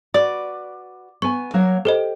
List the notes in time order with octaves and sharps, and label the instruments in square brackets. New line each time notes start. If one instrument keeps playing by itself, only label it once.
[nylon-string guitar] F#4 B4 [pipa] D5
[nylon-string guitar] B3 G#5 [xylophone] C#6
[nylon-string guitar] F#3 A#3 C#5
[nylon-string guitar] G4 [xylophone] A4 C5 D#5